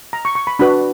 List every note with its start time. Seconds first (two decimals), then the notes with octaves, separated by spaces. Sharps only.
0.13 A#5
0.25 C#6
0.35 C#6
0.47 B5
0.59 D4 F#4 B4 B5